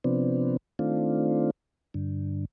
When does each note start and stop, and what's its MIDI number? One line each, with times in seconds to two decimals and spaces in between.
0.04 0.57 48
0.04 0.57 53
0.04 0.57 59
0.04 0.57 60
0.04 0.57 62
0.79 1.51 51
0.79 1.51 57
0.79 1.51 60
0.79 1.51 62
0.79 1.51 65
1.94 2.45 43
1.94 2.45 50